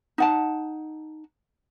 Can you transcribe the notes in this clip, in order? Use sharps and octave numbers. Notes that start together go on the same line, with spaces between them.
D#4 F#5 A5